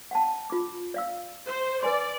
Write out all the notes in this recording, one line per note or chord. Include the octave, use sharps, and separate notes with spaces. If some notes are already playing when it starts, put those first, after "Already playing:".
F#5 G5 A5
F4 D6
D5 F5 E6
C5
B4 D5 G#5 C6